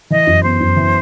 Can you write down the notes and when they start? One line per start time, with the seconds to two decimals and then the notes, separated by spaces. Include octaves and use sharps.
0.10 E3 D#5
0.27 F#2
0.43 B3 C5
0.60 F#2
0.76 E3